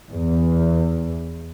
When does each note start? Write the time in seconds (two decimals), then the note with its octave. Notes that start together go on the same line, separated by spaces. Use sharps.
0.10 E2